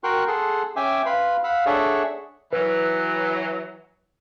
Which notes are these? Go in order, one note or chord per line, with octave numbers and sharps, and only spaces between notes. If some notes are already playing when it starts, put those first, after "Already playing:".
F#4 A#4 G5 C6 C#6 F#6
G#4 A4 F#5 C6
C#4 E5 G5 G#5 D6
B4 F5 B5 C6
F5 F#5 B5 E6
D4 G#4 A4 C#5 E5 F#5
E3 F#3 B4